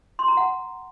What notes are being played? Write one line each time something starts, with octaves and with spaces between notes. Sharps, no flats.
C6
A#5
F#5